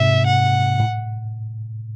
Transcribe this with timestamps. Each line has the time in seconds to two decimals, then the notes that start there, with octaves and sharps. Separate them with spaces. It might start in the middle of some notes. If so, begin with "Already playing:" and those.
Already playing: G#2 C3 E5
0.26 F#5
0.80 A2